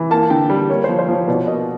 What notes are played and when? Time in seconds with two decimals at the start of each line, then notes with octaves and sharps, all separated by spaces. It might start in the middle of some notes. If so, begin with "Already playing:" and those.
Already playing: E3
0.11 A#3 A5
0.30 D3 G5
0.50 G3
0.69 A#3 C#5
0.84 F3 C5
0.99 C5
1.08 F3 C#5
1.28 B2 D5
1.47 A#3 D#5